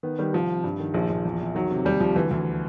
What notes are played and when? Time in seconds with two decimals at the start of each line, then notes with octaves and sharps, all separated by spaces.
0.03 D#3 B3
0.19 D#3 G3
0.33 C2 F3
0.49 C3
0.64 G2
0.80 D#3
0.94 A#1 F3
1.10 A#1
1.25 E2
1.40 E2
1.55 D#3 F#3
1.71 C3
1.85 D#2 G3
2.00 D#2 F3
2.15 D2 E3
2.31 D2 E3